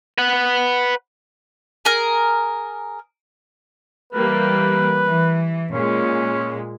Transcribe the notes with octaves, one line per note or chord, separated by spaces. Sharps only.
B4 F#5
G#4 A#4
E3 G3 A#3 B4
E3
A#2 G#3 C#4